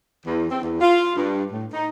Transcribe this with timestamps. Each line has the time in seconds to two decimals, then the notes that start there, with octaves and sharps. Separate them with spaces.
0.25 E2
0.50 C4
0.62 E2
0.80 F4
1.16 G2
1.52 A2
1.72 D#4